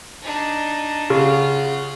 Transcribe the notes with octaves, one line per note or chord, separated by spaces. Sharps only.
D4 D#4
C#3 F4 F#5